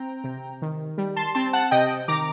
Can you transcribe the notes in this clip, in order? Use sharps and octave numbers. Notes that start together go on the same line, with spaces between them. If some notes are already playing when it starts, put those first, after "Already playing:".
Already playing: C4 G5 A#5
C3
D#3
G3
A5 C6
C4 A5 C6
F#5 A5
C3 D#5 G5
D#3 A#5 D6